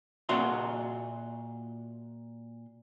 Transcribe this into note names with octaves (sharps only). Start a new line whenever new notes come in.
A#2 F#4 E5 C6